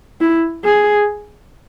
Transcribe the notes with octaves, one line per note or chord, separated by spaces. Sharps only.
E4
G#4